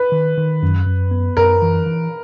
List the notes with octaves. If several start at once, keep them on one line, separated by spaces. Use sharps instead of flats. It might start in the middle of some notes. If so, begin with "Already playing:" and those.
Already playing: B4
D#3
D#3
F#2
F#2
B3
F#2 A#4
E3
E3